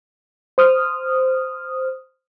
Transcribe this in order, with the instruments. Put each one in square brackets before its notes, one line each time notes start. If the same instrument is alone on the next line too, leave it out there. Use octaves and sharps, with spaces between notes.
[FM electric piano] C5 D#6 F6